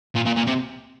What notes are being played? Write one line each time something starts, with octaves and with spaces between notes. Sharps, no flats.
A#2
A#2
A#2
C3